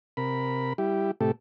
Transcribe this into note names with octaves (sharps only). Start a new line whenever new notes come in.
C3 A#4 B5
G3 E4 G4
A2 C3 A3 G4 A4